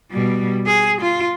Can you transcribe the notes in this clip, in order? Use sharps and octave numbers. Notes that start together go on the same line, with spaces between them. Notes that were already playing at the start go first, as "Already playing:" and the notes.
B2 G3
G#4
F4